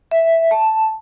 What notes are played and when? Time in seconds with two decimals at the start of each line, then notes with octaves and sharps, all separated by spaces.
0.11 E5
0.51 A5